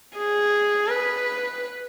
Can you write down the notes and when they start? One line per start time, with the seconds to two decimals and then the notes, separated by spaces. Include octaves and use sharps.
0.17 G#4
0.88 B4